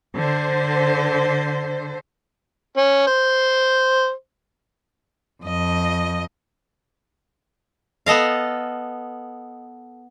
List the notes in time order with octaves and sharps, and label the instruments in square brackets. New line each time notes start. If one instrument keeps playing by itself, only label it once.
[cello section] D3 C5
[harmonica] C#4
C5
[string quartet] F2 D#5
[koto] B3 A4 D#5 F5